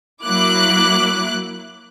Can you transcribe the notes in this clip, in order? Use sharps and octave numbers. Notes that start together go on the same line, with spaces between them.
F#3 A#3 E4 D6 F#6